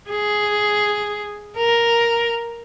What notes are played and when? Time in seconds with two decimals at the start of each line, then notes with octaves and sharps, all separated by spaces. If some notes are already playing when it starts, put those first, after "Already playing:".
0.11 G#4
1.58 A#4